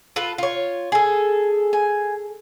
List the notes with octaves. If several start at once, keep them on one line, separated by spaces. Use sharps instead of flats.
F4 A4 B4
F4 C#5
G#4 A4 G#5
G#5